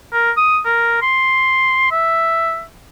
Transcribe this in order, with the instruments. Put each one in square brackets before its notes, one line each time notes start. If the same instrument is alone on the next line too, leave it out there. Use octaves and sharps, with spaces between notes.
[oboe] A#4
D#6
A#4
C6
E5